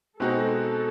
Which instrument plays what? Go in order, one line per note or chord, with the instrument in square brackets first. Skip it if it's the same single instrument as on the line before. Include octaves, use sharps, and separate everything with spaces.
[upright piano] B2 G#3 C4 D#4 F#4 [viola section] A4